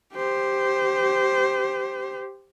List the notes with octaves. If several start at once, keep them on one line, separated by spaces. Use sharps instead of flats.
G4 C5